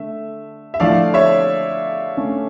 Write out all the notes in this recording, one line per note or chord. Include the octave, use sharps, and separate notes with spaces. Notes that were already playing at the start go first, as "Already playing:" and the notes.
Already playing: D3 A3 E5
E5
D3 F3 A3 E4 D5 F5
C#5 E5
D3 A3 C#4